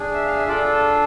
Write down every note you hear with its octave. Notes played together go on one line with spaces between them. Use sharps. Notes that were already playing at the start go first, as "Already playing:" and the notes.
Already playing: D4 G#4
E5
F5
E5
D4 F4 A4 D5